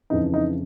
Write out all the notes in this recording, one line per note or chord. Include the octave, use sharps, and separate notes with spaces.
F2 C#3 E3 D#4
D#4